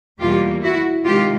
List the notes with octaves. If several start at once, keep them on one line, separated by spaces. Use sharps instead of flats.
E2 B2 G3 A#3 F4 G4
E4 F#4
C3 D#3 G#3 F4 G4